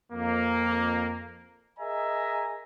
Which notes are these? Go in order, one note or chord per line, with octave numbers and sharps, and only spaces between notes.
F2 A#3
G#4 A#4 D#5 E5 G#5 A#5